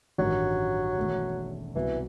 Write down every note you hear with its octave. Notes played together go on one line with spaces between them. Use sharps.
A1 G2 D#3 F#3 G3 D#4
E1 E2 D#3 A3
C2 B2 E3 F#3